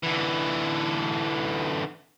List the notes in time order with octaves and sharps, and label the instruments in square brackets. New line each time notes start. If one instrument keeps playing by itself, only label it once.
[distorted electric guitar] D3 E3